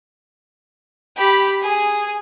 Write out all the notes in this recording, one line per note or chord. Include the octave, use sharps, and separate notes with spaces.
G4 B5
G#4